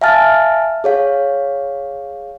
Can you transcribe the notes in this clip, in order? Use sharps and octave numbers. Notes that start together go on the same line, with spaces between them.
E5 F5 G#5 A5 F6 A6
G#4 C#5 F5